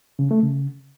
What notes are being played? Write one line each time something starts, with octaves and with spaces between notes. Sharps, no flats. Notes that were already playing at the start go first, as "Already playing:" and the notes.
C#3
A3
C#3